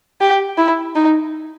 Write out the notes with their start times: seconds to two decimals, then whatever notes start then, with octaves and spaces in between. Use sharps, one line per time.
0.21 G4
0.58 E4
0.95 D#4